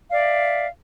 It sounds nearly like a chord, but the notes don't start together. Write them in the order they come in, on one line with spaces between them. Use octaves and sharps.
F5 D5 E5